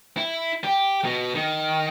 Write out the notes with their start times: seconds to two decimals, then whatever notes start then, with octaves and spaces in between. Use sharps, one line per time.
0.17 E4
0.64 G4
1.05 B2
1.35 D#3